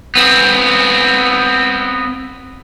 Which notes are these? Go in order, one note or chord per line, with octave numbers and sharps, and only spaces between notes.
B3 C4